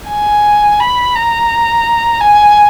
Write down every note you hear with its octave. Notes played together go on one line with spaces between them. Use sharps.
G#5
B5
A#5
G#5